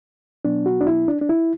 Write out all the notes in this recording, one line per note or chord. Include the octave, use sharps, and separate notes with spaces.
B2 F#3 B3 D4
F#4
D4
E4
D4
D4
E4